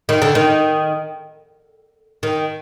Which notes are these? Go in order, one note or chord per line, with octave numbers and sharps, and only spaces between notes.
D#3
D3
D#3
D#3